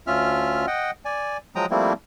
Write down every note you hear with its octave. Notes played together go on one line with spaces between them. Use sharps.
D2 C#4 F4 E5 F6
D#5 F#5 G5
D5 G#5
F3 F#3 G#3 G5 A#5 D#6
F3 G3 A3 A#3 C4 E4